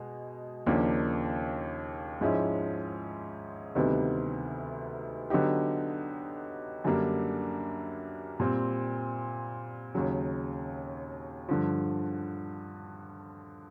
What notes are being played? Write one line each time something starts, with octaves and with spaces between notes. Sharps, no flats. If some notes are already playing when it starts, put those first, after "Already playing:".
Already playing: B2 G#3
D#2 C#3 F3 A#3 D4
G#2 F3 G#3 C#4 E4
D2 C3 D#3 G3 B3
D3 F#3 B3 D#4 G4
F#2 D3 G3 A#3 D4
A#2 G3 C4
D#2 C#3 F#3
G2 D3 F3